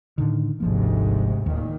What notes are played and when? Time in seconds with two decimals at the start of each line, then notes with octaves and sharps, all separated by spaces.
0.18 A2 D3 D#3
0.60 G#1 D2 G#2 C3 F3 A#3
1.46 D1 D#2 A#2 D#3